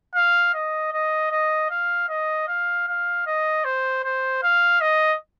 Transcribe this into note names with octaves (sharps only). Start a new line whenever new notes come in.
F5
D#5
D#5
D#5
F5
D#5
F5
F5
D#5
C5
C5
F5
D#5